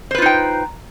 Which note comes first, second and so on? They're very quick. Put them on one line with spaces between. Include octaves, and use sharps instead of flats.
C5 B4 F4 D#4 G5